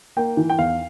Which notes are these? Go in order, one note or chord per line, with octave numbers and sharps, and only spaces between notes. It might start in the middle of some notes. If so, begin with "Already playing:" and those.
A#3 G5
E3
G5
E2 F5